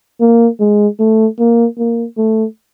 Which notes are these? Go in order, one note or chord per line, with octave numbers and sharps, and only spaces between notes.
A#3
G#3
A3
A#3
A#3
A3